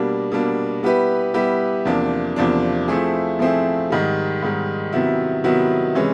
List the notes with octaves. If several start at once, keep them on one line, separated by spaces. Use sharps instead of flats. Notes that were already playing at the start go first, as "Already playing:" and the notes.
Already playing: B2 G3 A#3 D4
B2 G3 A#3 D4
G3 B3 E4 G4 B4
G3 B3 E4 G4 B4
E2 C3 F3 A#3 D4
E2 C3 F3 A#3 D4
F3 A3 C4 E4 G#4
F3 A3 C4 E4 G#4
G#2 D#3 G3
G#2 D#3 G3
C3 D#3 F#3 B3 E4
C3 D#3 F#3 B3 E4
C3 E3 G#3 C#4